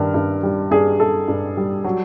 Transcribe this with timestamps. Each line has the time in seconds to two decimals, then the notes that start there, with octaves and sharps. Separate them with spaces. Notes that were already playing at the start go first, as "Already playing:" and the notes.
Already playing: G2 D#3 A#4
0.14 G2
0.43 G3
0.71 G2 G#4
1.00 G2 A4
1.28 G2
1.57 G3
1.84 F#3